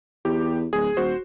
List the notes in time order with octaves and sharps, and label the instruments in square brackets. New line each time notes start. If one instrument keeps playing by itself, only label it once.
[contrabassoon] E2 [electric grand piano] G4
[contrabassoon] D1 [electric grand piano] G#4
[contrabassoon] D#1 [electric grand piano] F#4 C5